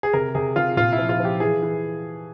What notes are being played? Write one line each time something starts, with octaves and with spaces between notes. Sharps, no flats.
G#4
C3 A#4
C3 G#4
C3 F4
A#2 F4
E4
F3
F4
F3
G4
E3 G#4
E3